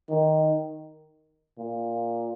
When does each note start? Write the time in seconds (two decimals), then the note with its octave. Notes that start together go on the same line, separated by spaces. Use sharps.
0.10 D#3
1.58 A#2